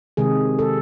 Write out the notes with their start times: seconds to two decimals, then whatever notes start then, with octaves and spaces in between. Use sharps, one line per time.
0.17 C3 D#3 G#3 G#4
0.59 A4